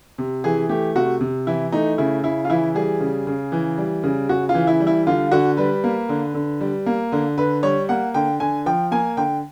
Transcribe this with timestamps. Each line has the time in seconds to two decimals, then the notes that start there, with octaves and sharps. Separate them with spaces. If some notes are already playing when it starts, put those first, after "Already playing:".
0.18 C3
0.44 E3 G#4
0.69 A3 G4
0.95 C3 F#4
1.21 C3
1.47 E3 E4
1.72 A3 D#4
1.98 C#3 E4
2.23 C#3 E4
2.45 F4
2.50 E3 E4
2.75 G3 G#4
3.00 C#3
3.27 C#3
3.52 E3
3.78 G3
4.04 C#3
4.29 C#3 F#4
4.49 F4
4.54 E3
4.67 E4
4.80 G3
4.87 E4
5.07 D3 F4
5.32 D3 F#4
5.57 G3 B4
5.84 A#3
6.09 D3
6.34 D3
6.61 G3
6.86 A#3
7.12 D3
7.38 D3 B4
7.63 G3 C#5
7.89 A#3 F#5
8.14 D3 G5
8.40 D3 G#5
8.66 F3 G5
8.91 A#3 G#5
9.17 D3 G5